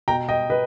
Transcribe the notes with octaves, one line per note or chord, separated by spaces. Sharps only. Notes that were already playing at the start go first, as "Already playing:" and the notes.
B2 G5 A#5
D#5 G5
B4 D#5